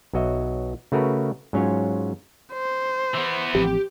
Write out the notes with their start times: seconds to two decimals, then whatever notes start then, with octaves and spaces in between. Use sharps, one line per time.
0.13 B1 F#3 F#4 D#5 E5
0.92 C#3 A3 F#4 A#4 B4
1.53 G#2 F#3 C#4 F4 C#5
2.53 C5
3.14 E3 B3
3.55 A1 F3 C4 G4